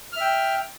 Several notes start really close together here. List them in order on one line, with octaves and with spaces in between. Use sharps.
F6 E5 G5